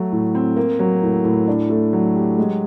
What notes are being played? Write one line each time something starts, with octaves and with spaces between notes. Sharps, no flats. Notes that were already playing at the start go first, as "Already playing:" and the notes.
Already playing: F#3 A3
A2
C4
A#3
F#3
A2
A2
D4
A3
F#3
G4
G#3